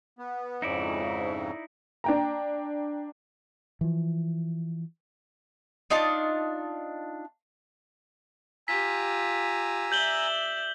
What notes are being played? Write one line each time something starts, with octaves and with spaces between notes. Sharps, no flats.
B3
F2 G#2 C#3 D#4 E4 D5
D4 G5 A#5
E3 F3
D4 D#4 F4 A5
F4 G4 G#5 A#5 E6 B6
D5 E5 G6 F#7 G7